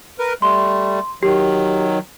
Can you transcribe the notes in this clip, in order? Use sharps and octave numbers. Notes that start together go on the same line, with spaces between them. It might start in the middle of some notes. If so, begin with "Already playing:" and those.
A#4 B4
G3 A3 C6
D#3 F#3 G4